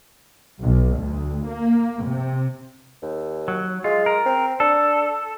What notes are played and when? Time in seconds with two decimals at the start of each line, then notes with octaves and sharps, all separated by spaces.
0.63 B1
0.98 D2
1.49 A#3
2.06 C3
3.02 D#2
3.48 F#3
3.84 G#3 F4
4.06 A#4
4.26 C4
4.60 D4 A4